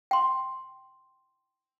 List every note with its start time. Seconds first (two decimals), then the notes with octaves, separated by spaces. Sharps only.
0.11 G5 C6